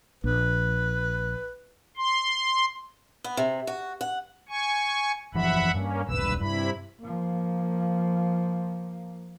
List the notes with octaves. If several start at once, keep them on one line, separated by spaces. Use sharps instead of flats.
A#1 B4
C6
B3
C3
F#4
F#5
G#5 C#6
F#1 E3 F3 E5 F#5 B5
G2 A#3 C#4
D#1 B1 G2 B4 E6
G2 C3 E4 B5
F3 A#3